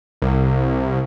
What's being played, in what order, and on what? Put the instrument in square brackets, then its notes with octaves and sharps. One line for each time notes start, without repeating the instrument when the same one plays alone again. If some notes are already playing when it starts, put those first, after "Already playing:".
[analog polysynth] C2